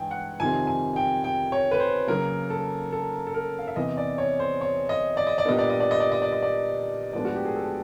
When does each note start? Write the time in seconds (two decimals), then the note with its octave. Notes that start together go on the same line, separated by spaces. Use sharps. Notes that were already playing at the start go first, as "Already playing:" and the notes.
Already playing: G2 E3 G#3 G5 G#5
0.11 F#5
0.40 F2 C3 D#3 G3 C4 G#5
0.67 G#5
0.96 G5
1.24 G5
1.52 C#5
1.71 B4
1.79 C5
2.07 C#3 F#3 A#3 A#4
2.50 A4
2.92 A4
3.27 A4
3.34 A#4
3.59 F5
3.67 E5
3.76 E2 C3 E3 D#5
3.97 D5
4.18 C#5
4.39 C5
4.61 C#5
4.89 D#5
5.17 D5
5.27 D#5
5.38 D5
5.45 A#2 G3 B3 D4 D#5
5.59 D5
5.70 D#5
5.80 D5
5.91 D#5
6.00 D5
6.12 D#5
6.22 D5
6.32 D#5
6.42 D5
7.13 A2 F3 G#3 B3 D4 D5
7.25 F#4
7.35 G4
7.45 G#4
7.56 A4